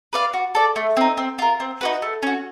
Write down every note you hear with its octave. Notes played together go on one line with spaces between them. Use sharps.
B4 D5 F5
F#4
A4 D5
A3
C4 D#4
C4
F4 A#4
C4
D#4 F#4 B4
A3
C#4 F#4